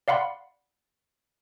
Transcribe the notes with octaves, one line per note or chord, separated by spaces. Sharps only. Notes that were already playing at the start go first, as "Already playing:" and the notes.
D5 F5 F#5 B5 C6